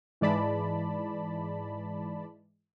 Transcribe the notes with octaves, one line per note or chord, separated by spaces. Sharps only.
G#2 E3 G#3 D5 A5 B5